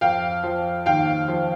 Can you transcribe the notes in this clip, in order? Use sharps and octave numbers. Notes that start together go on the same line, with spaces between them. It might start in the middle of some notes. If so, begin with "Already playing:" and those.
F2 F5 G5
F3
D#2 F5 G5
F3